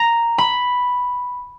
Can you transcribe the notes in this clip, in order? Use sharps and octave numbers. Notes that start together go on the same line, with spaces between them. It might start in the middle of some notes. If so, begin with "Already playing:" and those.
Already playing: A#5
B5